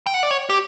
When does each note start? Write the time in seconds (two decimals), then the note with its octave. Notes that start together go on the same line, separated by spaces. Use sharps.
0.06 G5
0.14 F#5
0.23 D5
0.31 C#5
0.50 G4